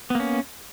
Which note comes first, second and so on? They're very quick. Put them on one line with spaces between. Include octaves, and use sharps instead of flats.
B3 A#3 C#4